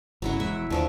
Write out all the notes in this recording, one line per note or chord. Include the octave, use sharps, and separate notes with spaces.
G1 C#3 F#3 E4 F#5
E1 G#3 E5
D#2 D3 F3 A3